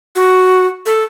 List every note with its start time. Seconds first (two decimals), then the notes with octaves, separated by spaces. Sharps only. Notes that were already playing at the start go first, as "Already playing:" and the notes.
0.16 F#4
0.86 A4